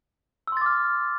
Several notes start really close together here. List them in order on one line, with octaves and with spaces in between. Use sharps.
E6 C6 A6 D6 F6